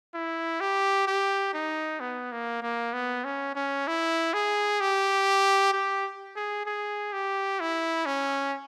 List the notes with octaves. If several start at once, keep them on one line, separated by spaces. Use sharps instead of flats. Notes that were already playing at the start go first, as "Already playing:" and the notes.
E4
G4
G4
D#4
B3
A#3
A#3
B3
C#4
C#4
E4
G#4
G4
G4
G#4
G#4
G4
E4
C#4